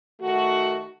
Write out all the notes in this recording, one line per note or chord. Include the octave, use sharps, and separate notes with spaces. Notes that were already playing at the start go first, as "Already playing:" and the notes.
D#3 A3 F#4